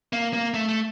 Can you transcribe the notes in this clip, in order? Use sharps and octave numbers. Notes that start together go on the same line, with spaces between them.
A#3
A#3
A3
A3